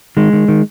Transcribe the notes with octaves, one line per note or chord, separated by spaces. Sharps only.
D#3 G#3
D#3
D#3